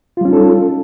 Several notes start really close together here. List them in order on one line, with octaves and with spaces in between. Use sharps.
F4 G3 C#4 D#4 A4